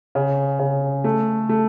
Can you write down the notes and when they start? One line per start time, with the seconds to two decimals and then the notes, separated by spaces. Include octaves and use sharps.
0.15 C#3
0.59 C#3
1.04 A3
1.49 A3